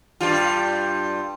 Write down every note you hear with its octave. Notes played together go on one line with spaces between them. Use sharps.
G2 G3 F4